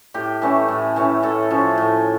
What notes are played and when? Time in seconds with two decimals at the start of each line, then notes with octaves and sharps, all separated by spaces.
0.14 A2 G4
0.42 E3 A3 C#4
0.68 A2
0.96 E3 A3 C#4
1.23 A2 A4
1.50 F3 C#4
1.77 A2